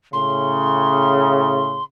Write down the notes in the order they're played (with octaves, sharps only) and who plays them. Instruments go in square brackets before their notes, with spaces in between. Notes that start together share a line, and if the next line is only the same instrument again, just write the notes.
[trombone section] A2 C#3 [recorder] C6